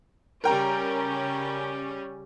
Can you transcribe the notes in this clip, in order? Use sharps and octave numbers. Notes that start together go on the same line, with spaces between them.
C#3 G3 C#4 A#4 G5 A#5